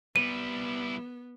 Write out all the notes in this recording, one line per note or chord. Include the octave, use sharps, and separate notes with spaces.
G3 B3 E4 D#7